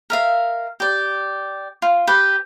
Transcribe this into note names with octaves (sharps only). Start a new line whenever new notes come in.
A#4 E5 F5
G4 D5
F4
G4 B4